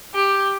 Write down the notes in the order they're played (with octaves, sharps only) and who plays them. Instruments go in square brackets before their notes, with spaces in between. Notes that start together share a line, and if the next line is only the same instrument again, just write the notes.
[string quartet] G4